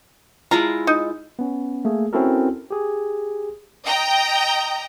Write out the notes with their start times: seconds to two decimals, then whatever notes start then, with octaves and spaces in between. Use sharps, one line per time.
0.51 G#3 E4 F4 A#5
0.87 D#4
1.39 B3 C#4
1.85 A3 A#3 G#4
2.13 C4 C#4 E4 F#4 A4 A#4
2.71 G4 G#4
3.85 D#5 G5 A#5